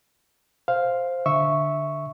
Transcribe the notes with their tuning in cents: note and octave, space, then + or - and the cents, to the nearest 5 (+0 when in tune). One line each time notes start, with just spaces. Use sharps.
C5 +0 F5 +0
D3 +0 E5 -10 C#6 +0